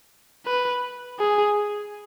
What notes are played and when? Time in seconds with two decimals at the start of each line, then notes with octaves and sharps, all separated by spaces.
0.46 B4
1.19 G#4